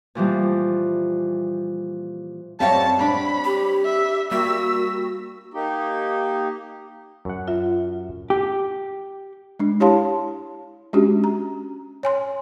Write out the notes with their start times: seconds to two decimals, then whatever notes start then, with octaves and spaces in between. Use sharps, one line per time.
0.15 A#2 E3 F3 G3
2.60 F#2 G3 C4 C#5 E5 F5 A5
3.01 D4 B5
3.45 G4
3.85 E5
4.31 G3 A#3 F#4 E6 B6
5.54 A#3 D#4 G4
7.25 F#2 F#5
7.48 F4 E5
8.30 G4
9.59 G#3 D4
9.80 E4 G4 C#5 F5 A5 C6
10.93 G#3 C#4 D4 F#4 G4
11.24 A#5
12.03 C#5 G#5 C6